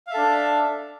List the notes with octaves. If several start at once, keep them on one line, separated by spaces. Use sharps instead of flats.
D4 A4 E5 F5